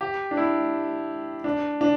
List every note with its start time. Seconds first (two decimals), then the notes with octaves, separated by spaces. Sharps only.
0.01 G4
0.31 D4
0.37 E4
1.44 D4
1.81 D4